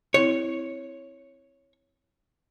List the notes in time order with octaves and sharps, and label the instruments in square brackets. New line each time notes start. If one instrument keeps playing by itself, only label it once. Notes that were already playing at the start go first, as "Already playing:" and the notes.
[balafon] C4 E4 [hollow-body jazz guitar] C#5